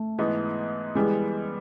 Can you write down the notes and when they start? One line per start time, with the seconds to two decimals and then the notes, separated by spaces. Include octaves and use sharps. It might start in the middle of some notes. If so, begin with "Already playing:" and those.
Already playing: A3
0.18 G#2 E3 G#3 B3 D#4
0.95 E3 G3 G#3 B3